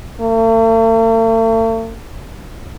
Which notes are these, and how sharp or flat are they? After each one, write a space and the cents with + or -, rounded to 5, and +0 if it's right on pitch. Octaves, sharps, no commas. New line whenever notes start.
A3 +45